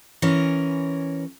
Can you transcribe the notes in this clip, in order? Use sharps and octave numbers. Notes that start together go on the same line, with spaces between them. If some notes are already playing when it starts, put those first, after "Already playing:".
E3 C#4 A#4 C#5